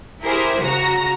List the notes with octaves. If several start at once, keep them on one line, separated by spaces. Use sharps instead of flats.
E4 G4 G#4 A#4 C5
C#3 F#4 A#5 A#6